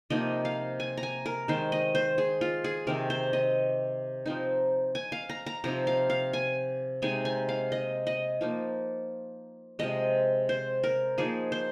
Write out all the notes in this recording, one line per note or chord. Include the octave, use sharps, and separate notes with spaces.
C3 F3 A#3 D#4 D#5
F5
G#5
A#5
G#5
A#4
D#3 G#3 D#4 C5
D#5
C5
G#4
F4
G#4
C3 D#3 C4 A#4
C5
D#5
F3 C4 D#4
G#5
F5
A#5
A#5
C3 F3 C4 D#4 A#5
F5
F5
G#5
C3 G#3 D#4 G#5
G#5
F5
D#5
D#5
F3 A#3 D#4
C3 F3 G#3 D#5
C5
A#4
F3 A#3 D#4 G#4
C5